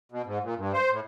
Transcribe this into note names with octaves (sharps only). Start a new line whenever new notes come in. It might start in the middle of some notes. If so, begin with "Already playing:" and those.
B2
G#2
A#2
G2
C5
A2